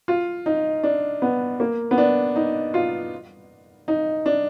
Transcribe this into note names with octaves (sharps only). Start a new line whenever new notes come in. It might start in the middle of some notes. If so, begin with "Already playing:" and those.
F4
D#4
D4
B3
A#3
B3
D4
D#4
F4
D#4
D4